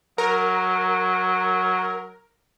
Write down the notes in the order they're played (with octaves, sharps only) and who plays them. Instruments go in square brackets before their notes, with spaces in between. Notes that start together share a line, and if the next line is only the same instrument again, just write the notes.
[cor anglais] F#3 [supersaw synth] A#4